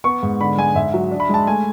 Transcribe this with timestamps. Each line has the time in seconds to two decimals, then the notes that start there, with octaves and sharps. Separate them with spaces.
0.04 B3 C#6
0.23 G#2
0.40 D3 B5
0.58 G#3 G#5
0.75 G#2 E5
0.94 F#3
1.11 D4
1.20 B5
1.29 G#3 A5
1.47 A3 G#5